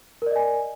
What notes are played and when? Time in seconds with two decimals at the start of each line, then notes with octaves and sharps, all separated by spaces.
0.22 A#4
0.26 D5
0.31 D#5
0.36 G#5